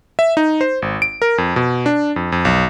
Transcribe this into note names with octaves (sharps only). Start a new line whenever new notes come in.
E5
D#4
C5
G#1
D7
A#4
F2
B2
D4
F2
F2
B1